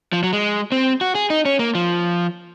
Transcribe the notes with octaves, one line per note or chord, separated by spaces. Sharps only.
F3
F#3
G#3
C4
F#4
G#4
D#4
C#4
A#3
F3